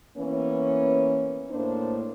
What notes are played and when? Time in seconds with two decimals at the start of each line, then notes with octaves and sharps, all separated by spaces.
0.17 E3 A#3 B3 C#4
1.51 A2 A#3 D4 C5